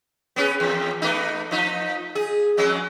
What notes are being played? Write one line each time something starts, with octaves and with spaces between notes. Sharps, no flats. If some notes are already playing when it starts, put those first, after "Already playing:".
B3 C#4 G#4
E2
A3 B3 D#4
F3 D#4
G#4
F2 F#3 G#3